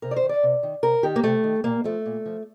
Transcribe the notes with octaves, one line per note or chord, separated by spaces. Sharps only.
C3 A#4
D5
C5
D#3
D5
C3
D#3
C3 A#4
D#3 G4
A#3
C3 A3
D#3
A#2 A#3
F3 A3
A#2
F3